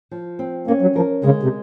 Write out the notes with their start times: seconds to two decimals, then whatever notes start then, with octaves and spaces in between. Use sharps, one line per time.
0.11 F3
0.39 C4
0.67 A#3 C#4
0.82 F#3
0.96 F3 A#4
1.23 C#3 G#3
1.43 C3